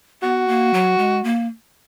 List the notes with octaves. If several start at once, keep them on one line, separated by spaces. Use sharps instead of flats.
B3 F#4
A#3
F#3
G#3
A#3